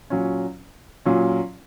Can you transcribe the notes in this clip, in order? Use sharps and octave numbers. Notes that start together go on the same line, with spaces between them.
A#2 F#3 C#4
A#2 F#3 C#4